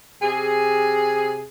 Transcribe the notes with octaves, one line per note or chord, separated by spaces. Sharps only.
C3 G#4